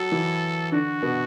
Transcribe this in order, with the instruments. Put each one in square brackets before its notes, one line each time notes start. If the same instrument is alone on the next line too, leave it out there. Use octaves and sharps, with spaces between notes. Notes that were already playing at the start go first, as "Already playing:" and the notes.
Already playing: [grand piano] F#3 F#4 [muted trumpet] A4
[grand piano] E3 E4
[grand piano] D3 D4 [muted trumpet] F#4
[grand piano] B2 B3